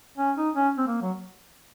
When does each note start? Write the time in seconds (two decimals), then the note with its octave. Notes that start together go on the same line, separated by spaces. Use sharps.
0.18 C#4
0.36 D#4
0.55 C#4
0.77 C4
0.87 A#3
1.02 F#3